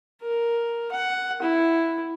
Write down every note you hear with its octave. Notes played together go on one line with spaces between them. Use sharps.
A#4
F#5
E4